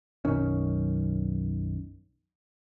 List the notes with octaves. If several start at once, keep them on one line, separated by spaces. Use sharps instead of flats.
B1 F#2 D#3 C#4